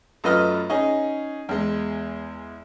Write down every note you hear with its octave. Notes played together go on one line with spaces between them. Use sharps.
F#2 A3 F4 B4 D#5 F6
C#4 D#4 G#4 D#5
E2 G#3